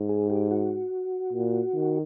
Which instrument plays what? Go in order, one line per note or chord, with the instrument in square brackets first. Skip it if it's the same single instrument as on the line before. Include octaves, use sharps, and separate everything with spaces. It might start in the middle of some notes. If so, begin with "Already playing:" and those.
Already playing: [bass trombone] G#2
[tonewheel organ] G#4
G4
F#4
[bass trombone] A#2
D#3